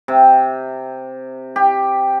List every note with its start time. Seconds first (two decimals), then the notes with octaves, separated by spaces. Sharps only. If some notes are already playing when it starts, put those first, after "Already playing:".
0.08 C3
1.56 G4